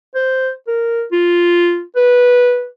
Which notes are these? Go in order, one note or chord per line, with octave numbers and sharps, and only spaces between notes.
C5
A#4
F4
B4